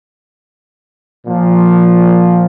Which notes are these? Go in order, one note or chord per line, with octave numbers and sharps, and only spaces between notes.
A#2 F3